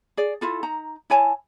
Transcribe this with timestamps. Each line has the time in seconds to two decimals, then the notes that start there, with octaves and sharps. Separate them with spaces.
0.17 G#4 D5
0.41 E4 F4 A4
0.63 D#4 A#5
1.10 E4 C#5 G#5 A5